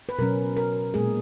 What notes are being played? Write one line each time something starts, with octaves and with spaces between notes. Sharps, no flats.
B4
B2 F#3 C#4 A#4
A#4
A#2 G#3 B3 G#4